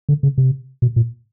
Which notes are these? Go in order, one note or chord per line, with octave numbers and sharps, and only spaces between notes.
D3
C#3
C3
B2
A#2